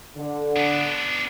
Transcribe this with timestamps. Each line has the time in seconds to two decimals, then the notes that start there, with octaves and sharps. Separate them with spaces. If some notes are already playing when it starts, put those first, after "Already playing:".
0.16 D3
0.56 B3 D4